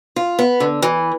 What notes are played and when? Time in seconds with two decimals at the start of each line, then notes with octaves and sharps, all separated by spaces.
0.16 F4
0.39 B3
0.60 D3
0.82 E3